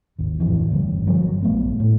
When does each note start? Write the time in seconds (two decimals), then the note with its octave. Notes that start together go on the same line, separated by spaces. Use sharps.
0.19 G#1 D#2
0.40 D1 G1 F2 E3
0.71 G1 D2 G2
1.07 G2 F3 F#3
1.42 A#1 A3 B3
1.80 A2